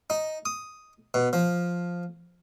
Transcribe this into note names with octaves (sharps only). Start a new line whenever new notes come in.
D#4
D#6
B2
F3